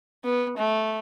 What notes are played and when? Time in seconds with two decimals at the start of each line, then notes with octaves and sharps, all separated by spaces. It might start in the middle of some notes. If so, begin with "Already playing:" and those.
0.24 B3
0.58 A3